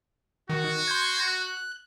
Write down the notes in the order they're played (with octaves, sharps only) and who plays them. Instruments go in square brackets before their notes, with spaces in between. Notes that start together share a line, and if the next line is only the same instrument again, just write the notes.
[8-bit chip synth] D#3 [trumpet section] F#4
[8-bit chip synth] C6 G6 G#6
F#6